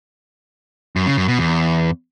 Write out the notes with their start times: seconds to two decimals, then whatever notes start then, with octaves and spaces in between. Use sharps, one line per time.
0.96 F#2
1.07 C#3
1.17 F#2
1.28 B2
1.39 E2